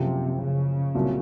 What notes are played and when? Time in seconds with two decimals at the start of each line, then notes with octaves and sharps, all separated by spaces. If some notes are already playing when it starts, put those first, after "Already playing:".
Already playing: F#1 F#2 C3 F3
0.41 C#3
0.95 C2 A#2 F#3